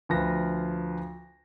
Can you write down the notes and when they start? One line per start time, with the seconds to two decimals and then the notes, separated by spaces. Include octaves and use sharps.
0.09 D2 F3 B4 A#6